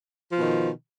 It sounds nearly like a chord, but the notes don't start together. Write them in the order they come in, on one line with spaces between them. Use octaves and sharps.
F3 B2 D#3